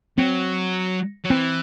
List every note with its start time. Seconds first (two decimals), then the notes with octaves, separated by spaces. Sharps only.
0.18 F#3 C4
1.24 F#3
1.30 E3 C4